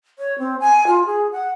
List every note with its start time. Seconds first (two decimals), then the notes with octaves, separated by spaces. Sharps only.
0.19 C#5
0.39 C4
0.60 G#5
0.87 F4
1.06 G#4
1.32 F#5